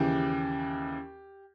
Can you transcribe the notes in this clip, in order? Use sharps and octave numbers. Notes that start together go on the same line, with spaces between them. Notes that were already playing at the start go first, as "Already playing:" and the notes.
Already playing: D#2 C#3 E3 G4